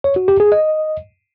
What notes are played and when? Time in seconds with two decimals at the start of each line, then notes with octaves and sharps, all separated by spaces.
0.04 C#5
0.16 F#4
0.28 G4
0.40 G#4
0.52 D#5